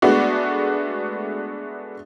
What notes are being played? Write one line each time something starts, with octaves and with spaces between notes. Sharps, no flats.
G#3 A3 B3 D4 F#4